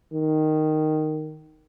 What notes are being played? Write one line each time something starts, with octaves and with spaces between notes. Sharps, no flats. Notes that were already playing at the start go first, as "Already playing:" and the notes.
D#3